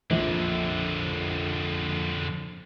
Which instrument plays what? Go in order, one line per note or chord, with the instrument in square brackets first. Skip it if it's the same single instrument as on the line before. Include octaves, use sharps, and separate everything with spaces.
[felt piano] A#1 [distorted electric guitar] F2 D3